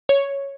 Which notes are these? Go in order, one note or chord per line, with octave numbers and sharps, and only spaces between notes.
C#5